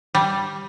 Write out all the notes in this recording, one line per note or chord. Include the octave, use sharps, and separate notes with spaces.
G3